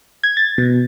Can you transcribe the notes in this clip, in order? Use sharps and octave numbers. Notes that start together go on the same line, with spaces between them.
G#6
A6
B2